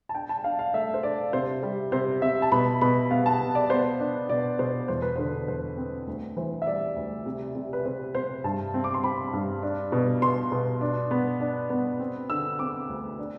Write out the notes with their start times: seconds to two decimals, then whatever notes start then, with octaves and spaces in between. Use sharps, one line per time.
0.09 A5
0.15 D4 G5
0.29 A5
0.44 D4 F5
0.59 F5
0.74 A3 E5
0.94 C5
1.03 D4 D5
1.33 C3 C5
1.63 G3
1.92 C3 C5
2.22 C3 E5
2.42 A5
2.52 B2 B5
2.81 B2 B5
3.11 B3 F5
3.26 A5
3.40 B2
3.55 D5
3.70 B3 C5
4.00 D4
4.29 B2 D5
4.59 B2 C5
4.88 E2 C5
5.02 B4
5.16 D3 C5
5.48 E2 C5
5.77 C4
6.07 D2
6.37 E3 C5
6.62 E5
6.67 G3 D5
6.96 D2
7.26 C3
7.55 C3
7.73 B4
7.85 C3 C5
8.15 C3 C5
8.44 G2 A5
8.74 C4
8.84 D6
8.94 C6
9.03 C4 B5
9.33 G2
9.63 D4
9.92 B2
10.22 B2 C6
10.52 B2
10.81 D4
11.11 B3
11.40 D4
11.70 B3
12.00 C4
12.30 D3 E6
12.59 C4 D6
12.89 D2
13.19 D4